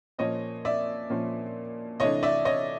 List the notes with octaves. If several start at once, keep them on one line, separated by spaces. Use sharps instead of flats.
A#2 F3 A#3 C#4 C#5 D#5
D5 E5
A#2 F3 A#3 C#4
C3 E3 A3 D4 C#5 D#5
D5 E5
C#5 D#5